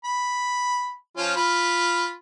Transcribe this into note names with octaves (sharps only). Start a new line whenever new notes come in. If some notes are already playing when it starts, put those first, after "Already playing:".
B5
F3 C#4 F4
F4 B5